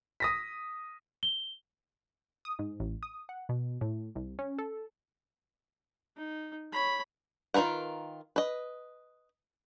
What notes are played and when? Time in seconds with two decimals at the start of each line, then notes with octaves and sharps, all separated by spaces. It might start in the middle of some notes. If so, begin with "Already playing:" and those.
0.20 D#6 A#6 B6
1.23 G7
2.45 D#6
2.59 G#2
2.80 A1
3.03 D#6
3.29 F#5
3.49 B2
3.81 A2
4.15 C2
4.39 C#4
4.58 A4
6.17 D#4
6.72 C#5 B5
7.54 D#3 F4 A#4 B4 F#5
8.36 B4 D#5